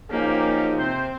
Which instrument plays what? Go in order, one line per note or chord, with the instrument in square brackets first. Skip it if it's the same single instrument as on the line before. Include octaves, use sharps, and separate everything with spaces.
[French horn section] F3 D#4 G#4 [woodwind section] F#3 C#4 G4 [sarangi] A#3
[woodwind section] C3 C5 [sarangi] C4